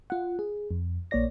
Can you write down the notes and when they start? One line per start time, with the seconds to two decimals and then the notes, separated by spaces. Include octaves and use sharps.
0.10 F4 F#5
0.39 G#4
0.71 F2
1.11 A#1 A#3 C#5 D5 A#6